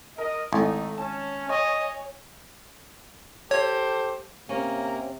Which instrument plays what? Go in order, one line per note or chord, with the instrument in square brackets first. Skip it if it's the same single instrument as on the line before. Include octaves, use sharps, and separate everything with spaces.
[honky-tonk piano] A#4 [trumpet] D#5
[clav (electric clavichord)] G#1 [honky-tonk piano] A3 E4 [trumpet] D#4
[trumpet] C#4 [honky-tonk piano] A5
[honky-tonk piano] C#5 G#5 C#6 [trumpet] D#5
[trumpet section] G4 A4 C5 [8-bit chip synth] C#5
[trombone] C3 [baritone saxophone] A#3 [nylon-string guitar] C#4